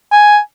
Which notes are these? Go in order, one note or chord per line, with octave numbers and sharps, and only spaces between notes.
G#5